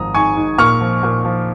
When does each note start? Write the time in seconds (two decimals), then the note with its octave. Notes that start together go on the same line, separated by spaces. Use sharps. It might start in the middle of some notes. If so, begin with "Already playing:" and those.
Already playing: G#1 F3 A#5 D#6
0.14 G#2 G#5 C#6
0.36 G#2
0.58 A#2 C#6 F6
0.81 F3
1.03 A#2
1.25 F3